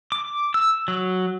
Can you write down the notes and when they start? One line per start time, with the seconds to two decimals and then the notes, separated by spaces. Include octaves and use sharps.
0.12 D6
0.54 E6
0.88 F#3